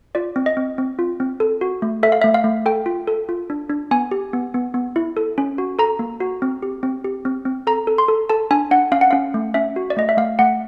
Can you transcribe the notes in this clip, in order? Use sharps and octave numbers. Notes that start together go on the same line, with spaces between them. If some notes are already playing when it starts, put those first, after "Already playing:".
F4 D5
C4
D#5
C4
C4
F4
C4
A4
F#4
A3
A4 E5
F5
A3 E5
F5
A3
A4 G5
F4
A4
F4
D4
D4
B3 G#5
G4
B3
B3
B3
E4
A4
C#4
F#4
A4 A#5
A#3
F#4
C4
G4
C4
G4
C4
C4
A4 A#5
A4
C6
A4
A4 A5
D4 G#5
D4 F#5
C#4 F5
F#5
C#4 F5
A3
C#4 E5
F#4
D5
A3 D#5
E5
A3 F5
A3 F#5